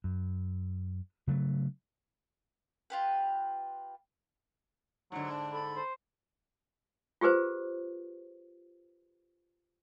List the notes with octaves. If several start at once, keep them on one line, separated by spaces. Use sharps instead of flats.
F#2
C#3 F#3 A3
F4 G4 B4
G#2 D3 F#3
D4
A4 B5
C5
F4 G4 G#4 B4 C5